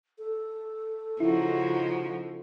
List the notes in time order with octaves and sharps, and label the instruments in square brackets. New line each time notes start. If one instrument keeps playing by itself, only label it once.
[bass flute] A4
[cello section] C#3 D#4 F#4 [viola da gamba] F3 [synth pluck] E4